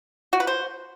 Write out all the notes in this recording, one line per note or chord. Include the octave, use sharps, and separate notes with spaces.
F#4
B4
C5